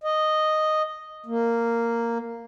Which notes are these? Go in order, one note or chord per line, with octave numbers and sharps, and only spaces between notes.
D#5
A#3